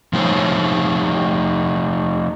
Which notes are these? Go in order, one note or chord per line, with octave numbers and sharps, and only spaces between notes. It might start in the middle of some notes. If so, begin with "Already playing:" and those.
F3 A3 D#4 A#4 C5 C#5